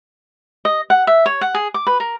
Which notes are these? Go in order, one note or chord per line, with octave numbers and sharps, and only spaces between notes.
D#5
F#5
E5
C#5
F#5
G#4
D6
B4
A#4